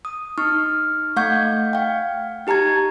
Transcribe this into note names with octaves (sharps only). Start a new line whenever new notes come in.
D#6
D#4 C#6 F6
A3 F5 F#5 C#6 G6 G#6
F5 G5
D#4 G4 A5 A#5 G#6